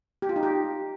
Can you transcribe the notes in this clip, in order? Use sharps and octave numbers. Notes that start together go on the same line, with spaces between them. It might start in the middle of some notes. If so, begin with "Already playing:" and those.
G4
F4
D#4
G4